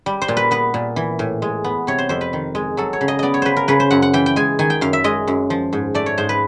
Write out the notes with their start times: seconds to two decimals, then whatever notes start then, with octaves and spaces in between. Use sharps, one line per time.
0.06 G3
0.22 C5
0.28 A#2
0.37 B4
0.51 B3 B4
0.74 A#2
0.96 E3
1.19 A2
1.42 G#3
1.64 B3
1.87 C3 C#5
1.98 C5
2.09 F2 C5
2.21 B4
2.33 D#3
2.55 G#3
2.77 F#3 A4
2.93 C#5
3.01 C#3
3.08 D#5
3.19 B3 D5 D#5
3.34 C#5
3.42 C#3 B4 C5
3.57 A#4
3.68 C#3 B4
3.80 C5
3.90 F#2 F#5
4.02 F#5
4.13 E3 G5
4.26 G5
4.36 G#3 G#5
4.59 D#3 G#5
4.70 G5
4.81 F#2 F5
4.93 E5
5.04 G#3 D#5
5.27 F#2
5.50 F3
5.73 G#2
5.95 A3 D5
6.06 C#5
6.18 G#2 C5
6.29 B4